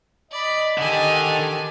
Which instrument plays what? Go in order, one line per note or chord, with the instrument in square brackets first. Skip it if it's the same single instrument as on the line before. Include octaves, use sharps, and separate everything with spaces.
[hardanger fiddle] D5 B5 [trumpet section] D#5
[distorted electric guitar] D3 A4 [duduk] D#3 [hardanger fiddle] G4 G#5